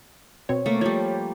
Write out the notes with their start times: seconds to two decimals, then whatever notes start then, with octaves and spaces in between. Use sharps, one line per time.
0.49 B2 C4 C#5
0.66 A3 A#3
0.81 F3 G3 C#5